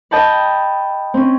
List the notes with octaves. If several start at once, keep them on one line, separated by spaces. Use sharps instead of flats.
D#5 G5 A5 B5
C4 C#4